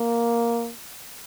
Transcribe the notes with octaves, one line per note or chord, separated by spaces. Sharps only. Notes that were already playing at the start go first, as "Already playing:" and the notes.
Already playing: A#3